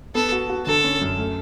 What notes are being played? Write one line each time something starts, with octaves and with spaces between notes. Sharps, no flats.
B3 A4
F#4
F#4
D3 A4
C#4
F#2
A3